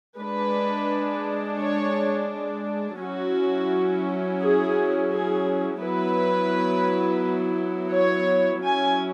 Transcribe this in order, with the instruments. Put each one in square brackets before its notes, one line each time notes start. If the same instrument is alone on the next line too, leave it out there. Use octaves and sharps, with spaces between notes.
[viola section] G#3 D4 B4
C#5
F#3 C#4 E4 F#4
G#4
G#4
F#3 B3 E4 B4
C#5
F#3 C#4 E4 G#5